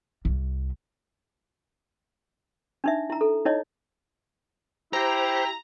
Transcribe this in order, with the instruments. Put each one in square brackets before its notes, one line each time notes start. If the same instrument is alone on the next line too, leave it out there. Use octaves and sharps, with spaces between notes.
[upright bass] C2
[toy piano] D4 D#4 E5
E4 A#5
A4
D#4 E4 C#5 D#5
[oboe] E4 [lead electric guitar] G4 [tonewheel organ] C5 [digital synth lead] A#5